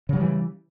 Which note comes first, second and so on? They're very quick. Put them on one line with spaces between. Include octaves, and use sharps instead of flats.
C#3 F#3 G3 E3